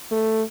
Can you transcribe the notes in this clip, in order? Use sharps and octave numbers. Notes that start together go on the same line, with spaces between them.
A3